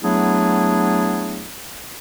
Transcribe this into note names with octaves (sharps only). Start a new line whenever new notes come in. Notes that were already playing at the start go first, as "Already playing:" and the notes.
F#3 A3 B3 D4 E4 G#4